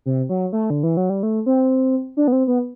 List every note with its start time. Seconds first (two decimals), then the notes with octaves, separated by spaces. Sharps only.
0.06 C3
0.29 F#3
0.53 A3
0.70 D3
0.83 E3
0.97 F#3
1.10 G3
1.23 A3
1.46 C4
2.17 D4
2.28 B3
2.32 C4
2.47 B3